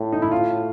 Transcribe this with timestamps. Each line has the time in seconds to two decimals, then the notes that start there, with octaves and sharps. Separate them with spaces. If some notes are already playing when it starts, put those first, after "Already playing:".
Already playing: A2
0.13 D#4
0.22 E4
0.32 F4